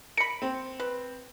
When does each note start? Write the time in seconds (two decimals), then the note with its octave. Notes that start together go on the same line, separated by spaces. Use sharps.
0.17 A#4 B5 C#7
0.42 C4
0.80 B4